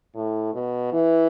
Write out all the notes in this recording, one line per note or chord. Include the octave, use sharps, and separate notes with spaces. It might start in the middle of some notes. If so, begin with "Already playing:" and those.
A2
B2
E3